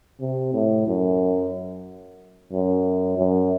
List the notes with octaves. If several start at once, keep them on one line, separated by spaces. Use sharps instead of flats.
C3
A2
F#2
F#2
F#2